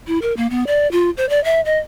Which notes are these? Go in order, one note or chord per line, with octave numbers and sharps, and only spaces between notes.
E4
A#4
A#3
B3
D5
F4
C5
D5
E5
D#5